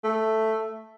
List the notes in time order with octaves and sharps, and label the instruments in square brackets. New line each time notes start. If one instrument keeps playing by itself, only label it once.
[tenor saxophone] A3